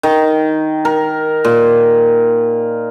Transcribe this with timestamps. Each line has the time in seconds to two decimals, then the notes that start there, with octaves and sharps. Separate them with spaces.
0.03 D#3
0.85 A#4
1.44 A#2